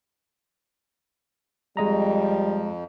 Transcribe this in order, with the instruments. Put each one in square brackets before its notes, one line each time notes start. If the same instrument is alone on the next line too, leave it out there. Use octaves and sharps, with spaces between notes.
[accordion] F2 [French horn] G3 [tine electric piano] G#3 D#5 A#5